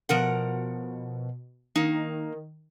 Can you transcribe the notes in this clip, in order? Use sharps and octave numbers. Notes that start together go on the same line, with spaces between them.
B2 F3 A#4 F#5
D#3 A#3 D#4